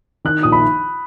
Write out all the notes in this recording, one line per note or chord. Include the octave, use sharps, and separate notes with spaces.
D#3 F#6
A#1 D#6
B5